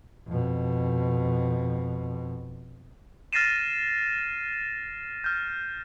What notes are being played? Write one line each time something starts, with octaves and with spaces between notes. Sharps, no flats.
F2 B2
F6 A6 A#6 C7 D#7 E7
F6 G6